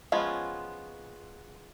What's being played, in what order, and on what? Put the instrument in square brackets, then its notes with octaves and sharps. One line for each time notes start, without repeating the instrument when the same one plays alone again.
[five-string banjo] F3 G#3 B3 C#4 F4